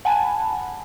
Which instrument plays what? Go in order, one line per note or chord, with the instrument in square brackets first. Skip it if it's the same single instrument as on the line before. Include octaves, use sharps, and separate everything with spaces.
[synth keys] F#5 G#5 A5 B5